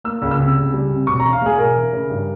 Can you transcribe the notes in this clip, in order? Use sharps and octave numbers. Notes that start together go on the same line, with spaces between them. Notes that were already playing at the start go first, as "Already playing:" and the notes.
A#3 E6
C#2
E6
C3
C#2
G3
C3
E1 C#6
E3 A#5
F5
E2 G#4
E1 A#4
E3
C#3
G2